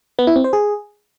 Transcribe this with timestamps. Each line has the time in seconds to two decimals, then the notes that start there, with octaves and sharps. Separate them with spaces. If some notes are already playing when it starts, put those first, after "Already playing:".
0.19 B3
0.27 E4
0.36 C4
0.44 C5
0.53 G#4